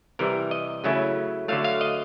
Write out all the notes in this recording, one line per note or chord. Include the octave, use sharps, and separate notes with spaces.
C3 E3 G3 A#4
D#5
C#3 F#3 A3 C#4 E4
D3 F#3 A3 F5
F5
D#5